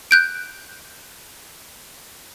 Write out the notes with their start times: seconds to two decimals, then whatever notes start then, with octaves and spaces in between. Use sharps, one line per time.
0.11 F#6 G6 D7